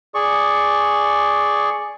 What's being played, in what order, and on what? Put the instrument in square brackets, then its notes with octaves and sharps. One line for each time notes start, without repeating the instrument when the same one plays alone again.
[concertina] G#4 D5 C#6